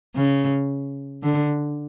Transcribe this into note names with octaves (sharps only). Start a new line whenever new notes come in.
C#3
D3